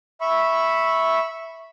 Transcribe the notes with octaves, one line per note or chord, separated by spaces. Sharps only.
E5 B5 C#6